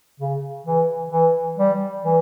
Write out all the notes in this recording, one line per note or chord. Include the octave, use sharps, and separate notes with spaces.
C#3
E3
E3
G3
E3